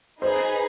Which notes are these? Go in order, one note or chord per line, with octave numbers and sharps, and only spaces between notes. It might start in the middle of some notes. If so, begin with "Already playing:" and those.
D#4 G#4 B4 C5